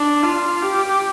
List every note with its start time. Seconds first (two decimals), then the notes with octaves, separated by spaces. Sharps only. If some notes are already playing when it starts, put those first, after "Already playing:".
Already playing: D4
0.23 F4
0.62 G4